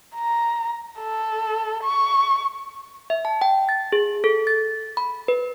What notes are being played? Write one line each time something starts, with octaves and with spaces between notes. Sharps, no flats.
A#5
A4
C#6
E5
A5
G5
A6
G#4
A4
A6
B5
B4